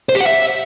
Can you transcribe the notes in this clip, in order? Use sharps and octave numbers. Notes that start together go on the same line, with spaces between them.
C5
G4
F#5
E5